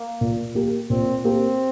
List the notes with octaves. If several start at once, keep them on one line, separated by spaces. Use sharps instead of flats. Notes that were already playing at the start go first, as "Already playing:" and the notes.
Already playing: A#3
A#2
A#3 G4
A#2 C4
A#3 C4 G4